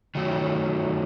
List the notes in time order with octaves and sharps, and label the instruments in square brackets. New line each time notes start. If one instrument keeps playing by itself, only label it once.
[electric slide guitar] D#3 F#3 A3